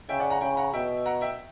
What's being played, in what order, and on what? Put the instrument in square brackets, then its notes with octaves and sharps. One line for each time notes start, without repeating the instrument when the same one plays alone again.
[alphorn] C#3 [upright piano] E5 G5
[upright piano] D5 F#5
F#5 A#5
[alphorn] C#3 [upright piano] G5 B5
[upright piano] F#5 A#5
[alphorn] B2 [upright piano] E5 G5
[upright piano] F#5 A#5
E5 G5